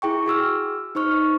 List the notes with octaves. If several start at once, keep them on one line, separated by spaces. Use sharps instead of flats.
E4 G#4 G5 C#6
F#4 G#4 E6 F6
D#4 C5 C#6 F6